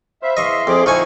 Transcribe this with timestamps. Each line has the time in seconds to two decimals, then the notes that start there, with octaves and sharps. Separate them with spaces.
0.23 C5 E5 F5 B5
0.37 E2 D#5 F5 C6 C#6
0.67 F2 G#4 D6
0.86 D#3 F3 D#4 E4 G#5 C#6